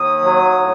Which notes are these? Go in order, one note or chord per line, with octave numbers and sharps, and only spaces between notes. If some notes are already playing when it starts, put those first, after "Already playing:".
Already playing: D#2 D#6
F#3
A2